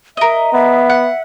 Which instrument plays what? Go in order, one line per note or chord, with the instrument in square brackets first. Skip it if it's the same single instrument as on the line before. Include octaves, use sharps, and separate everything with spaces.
[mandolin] A#4 D#5 [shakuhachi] E5
[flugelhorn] B3 [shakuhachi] E5
[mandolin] F#5